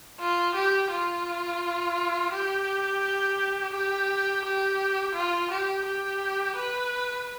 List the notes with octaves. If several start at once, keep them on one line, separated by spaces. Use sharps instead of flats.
F4
G4
F4
G4
G4
G4
F4
G4
G4
B4